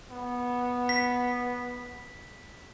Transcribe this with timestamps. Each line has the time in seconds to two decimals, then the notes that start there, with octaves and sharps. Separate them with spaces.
0.11 B3
0.89 B6